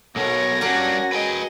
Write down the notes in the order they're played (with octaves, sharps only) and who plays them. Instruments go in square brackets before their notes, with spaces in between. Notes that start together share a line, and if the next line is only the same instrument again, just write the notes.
[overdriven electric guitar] B1 B2 [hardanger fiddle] A#4 C#5 [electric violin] G#5 A#6
[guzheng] F#3 A#3 [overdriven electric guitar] G3 D4 [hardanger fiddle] C#4 F#5
[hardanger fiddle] G#4 D#5 [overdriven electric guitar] B4 G5